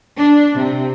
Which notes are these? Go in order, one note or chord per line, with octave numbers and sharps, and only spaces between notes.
D4
C3